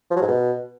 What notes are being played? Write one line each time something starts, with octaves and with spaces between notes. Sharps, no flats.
F3
F#3
G#2
B2